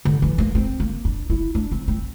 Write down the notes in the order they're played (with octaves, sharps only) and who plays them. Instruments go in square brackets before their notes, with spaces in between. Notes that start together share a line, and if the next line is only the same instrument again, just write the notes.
[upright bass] D3
E3
A#3
C4
A#3
D4
E4
D4
C4
C4